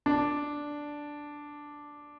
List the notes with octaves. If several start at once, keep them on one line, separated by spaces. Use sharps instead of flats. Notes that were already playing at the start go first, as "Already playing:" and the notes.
D4